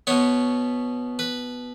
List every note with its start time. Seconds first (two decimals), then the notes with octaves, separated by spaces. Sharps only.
0.07 B2 B3 C#5
1.19 B4